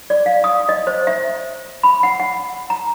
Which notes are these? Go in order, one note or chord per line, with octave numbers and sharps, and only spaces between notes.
D5
F5
D#6
D#5
C5
E5
B5
F#5
F#5
A#5